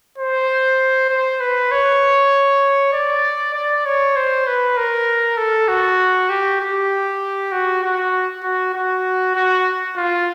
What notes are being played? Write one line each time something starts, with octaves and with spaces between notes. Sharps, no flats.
C5
C5
B4
C#5
D5
D5
C#5
C5
B4
A#4
A4
F#4
G4
G4
F#4
F#4
F#4
F#4
F#4
F4